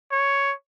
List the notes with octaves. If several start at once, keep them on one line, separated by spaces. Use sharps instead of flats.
C#5